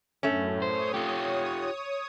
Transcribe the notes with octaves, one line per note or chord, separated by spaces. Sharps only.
F#2 A2 A3 C#4
C5 C#5 D#6
F4 G4